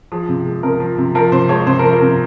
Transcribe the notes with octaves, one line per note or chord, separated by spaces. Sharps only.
F3 G#4
C3
G#3
C3 A#4
F3
C3
F3 A#4
C3 C5
G#3 C#5
C3 C5
A#4
F3
A#4
C3